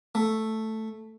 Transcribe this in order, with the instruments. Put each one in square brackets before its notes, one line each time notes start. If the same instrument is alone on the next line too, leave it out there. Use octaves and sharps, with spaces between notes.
[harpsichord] A3